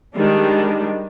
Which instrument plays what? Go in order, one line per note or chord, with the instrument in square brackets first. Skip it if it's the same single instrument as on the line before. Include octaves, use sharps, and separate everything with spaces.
[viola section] D#3 G3 G#3 D4